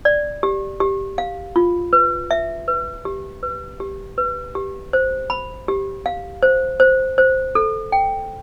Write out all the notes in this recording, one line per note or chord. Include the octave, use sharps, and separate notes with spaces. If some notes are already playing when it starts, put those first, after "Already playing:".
D5
G4
G4
F5
F4
B4
E5
B4
G4
B4
G4
B4
G4
C5
B5
G4
F5
C5
C5
C5
A4
G5